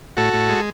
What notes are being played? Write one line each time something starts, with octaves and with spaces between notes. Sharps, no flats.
A2 F#4 A4
A2
G#3